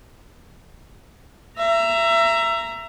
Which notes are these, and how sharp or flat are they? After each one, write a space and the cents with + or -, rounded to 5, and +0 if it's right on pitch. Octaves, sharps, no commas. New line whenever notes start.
E5 +25 A#5 +0